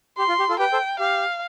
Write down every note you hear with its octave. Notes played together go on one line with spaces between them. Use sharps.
G4 C6
F4
G4
F4 A4
G4 B4 G5
A4 C5
G4 F5